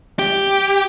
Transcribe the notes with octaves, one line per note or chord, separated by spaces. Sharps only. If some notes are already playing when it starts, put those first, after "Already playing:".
G4